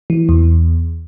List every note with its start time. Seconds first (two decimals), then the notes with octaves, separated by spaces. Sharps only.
0.10 E3
0.29 E2